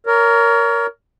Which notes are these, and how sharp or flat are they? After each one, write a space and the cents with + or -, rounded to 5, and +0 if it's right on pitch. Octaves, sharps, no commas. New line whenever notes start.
A#4 +0 C#5 +30